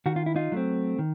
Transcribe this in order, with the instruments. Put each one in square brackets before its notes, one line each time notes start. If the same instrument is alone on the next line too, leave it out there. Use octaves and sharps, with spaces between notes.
[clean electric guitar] D#3 F#4
F4
E4
D#4 F4
F#3 A3 C4
D#3